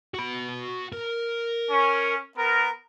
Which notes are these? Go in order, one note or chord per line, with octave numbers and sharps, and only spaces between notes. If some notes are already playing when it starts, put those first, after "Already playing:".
F#4 B5
A#4
C#4
B3 A#4